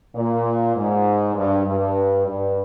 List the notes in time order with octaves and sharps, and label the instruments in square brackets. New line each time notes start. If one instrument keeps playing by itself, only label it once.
[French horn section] A#2
G#2
G2
G2
G2